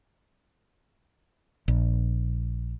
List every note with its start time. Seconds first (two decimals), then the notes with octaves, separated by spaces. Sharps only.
1.68 A#1